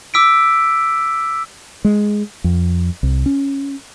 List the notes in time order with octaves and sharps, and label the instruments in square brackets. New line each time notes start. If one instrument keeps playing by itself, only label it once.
[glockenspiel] D6 E6 B6 D7
[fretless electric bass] G#3
F2
C2
C#4